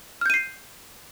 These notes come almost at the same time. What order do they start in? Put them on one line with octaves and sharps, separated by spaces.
F6 G6 D#7 C7